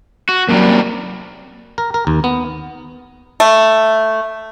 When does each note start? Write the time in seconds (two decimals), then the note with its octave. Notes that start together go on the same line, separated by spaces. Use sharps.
0.29 F#4
0.49 F#2 C3 F#3 G3 A#3
1.78 A#4
1.94 A#4
2.07 D#2
2.24 B3
3.40 A3